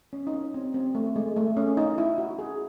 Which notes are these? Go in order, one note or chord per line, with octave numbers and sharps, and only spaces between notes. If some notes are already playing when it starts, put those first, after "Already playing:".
C#4
D#4
C#4
C4
C4
A3
G#3
A3
C#4
D#4
E4
F#4
G#4